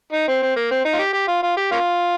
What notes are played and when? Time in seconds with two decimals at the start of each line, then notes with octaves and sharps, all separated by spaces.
0.12 D#4
0.28 C4
0.42 C4
0.56 A#3
0.71 C4
0.85 D#4
0.93 F4
0.99 G4
1.13 G4
1.28 F4
1.43 F4
1.57 G4
1.72 A#3 C#4 F4